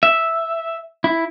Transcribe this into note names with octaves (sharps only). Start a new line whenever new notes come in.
E5
E4